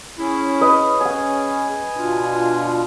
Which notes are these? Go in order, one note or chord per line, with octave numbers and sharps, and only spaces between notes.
C#4 E4 G#4
B4 D#5
F#5 G#5 D#6
B2 D4 F4